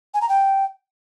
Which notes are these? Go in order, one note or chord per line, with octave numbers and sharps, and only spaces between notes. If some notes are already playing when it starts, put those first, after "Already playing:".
G#5
A#5
G5